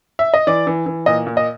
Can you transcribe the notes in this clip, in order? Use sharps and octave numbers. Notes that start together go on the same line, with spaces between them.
E5
D#5
E3 D5
E3
E3
A#2 D#5
A#2
D#5